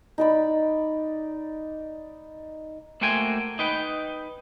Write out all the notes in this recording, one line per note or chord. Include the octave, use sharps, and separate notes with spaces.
D#4 D5 B5
A3 A#3 F#4 C5 G5 G#5
D#4 B4 G5